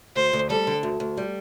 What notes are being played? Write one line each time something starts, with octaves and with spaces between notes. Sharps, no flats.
D2 C5
D2
G3 A4
D3
D2
D2
G3